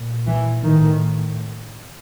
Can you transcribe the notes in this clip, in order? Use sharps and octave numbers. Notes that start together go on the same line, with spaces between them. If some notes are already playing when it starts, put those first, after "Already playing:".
Already playing: A#2
E3
A2 D#3